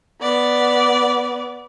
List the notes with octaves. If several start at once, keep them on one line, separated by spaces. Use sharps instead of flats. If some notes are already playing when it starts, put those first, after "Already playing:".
B3 D5